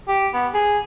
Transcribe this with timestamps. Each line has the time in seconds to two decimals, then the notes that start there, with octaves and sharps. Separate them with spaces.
0.08 G4
0.34 B3
0.54 G#4